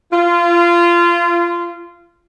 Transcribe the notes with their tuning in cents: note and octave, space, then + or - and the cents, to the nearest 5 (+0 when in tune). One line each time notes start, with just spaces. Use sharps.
F4 -20